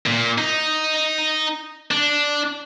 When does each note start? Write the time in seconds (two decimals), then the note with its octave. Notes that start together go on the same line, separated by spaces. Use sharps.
0.06 A#2
0.38 D#4
1.91 D4